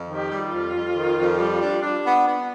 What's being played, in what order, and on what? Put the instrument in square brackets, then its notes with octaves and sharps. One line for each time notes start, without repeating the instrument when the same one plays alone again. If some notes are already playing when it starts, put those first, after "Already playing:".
Already playing: [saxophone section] F2
D#3
[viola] G4
[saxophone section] G3
[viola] F4
[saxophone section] F2
F2
D#3
F2
G3
D4
D4
B3
B3